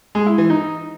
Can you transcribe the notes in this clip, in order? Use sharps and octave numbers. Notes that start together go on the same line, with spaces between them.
G#3
E4
E3
D#4